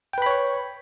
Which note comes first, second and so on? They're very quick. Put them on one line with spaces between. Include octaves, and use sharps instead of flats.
G5 B4 B5 C#5 C#6